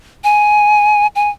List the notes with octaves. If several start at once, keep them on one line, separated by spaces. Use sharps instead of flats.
G#5
G#5